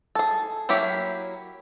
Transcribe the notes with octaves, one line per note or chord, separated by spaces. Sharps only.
G#4 A4
F#3 A#3 E4 G4